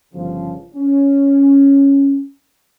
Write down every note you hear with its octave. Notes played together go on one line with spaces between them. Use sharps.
G1 C#3 F3
C#4